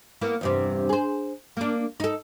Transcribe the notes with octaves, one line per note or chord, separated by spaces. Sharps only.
A#3 B3 E4
E2 G2 C3
G#4 C5
A#3 D4
D#4 A4